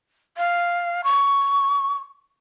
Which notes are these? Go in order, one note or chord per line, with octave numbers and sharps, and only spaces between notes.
F5
C#6